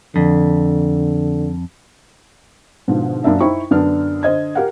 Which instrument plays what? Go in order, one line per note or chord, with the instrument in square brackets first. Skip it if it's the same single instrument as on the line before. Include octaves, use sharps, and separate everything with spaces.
[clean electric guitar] F2 [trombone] D3
[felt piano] G#2 B2 D3 F3
F#2 A#3 D4 E5
D#4 E4 C5 G5 C#6
F#2 D3 B3 D4 F6
D3 C5 D#5 G#6
G4 A#4 F5 F#5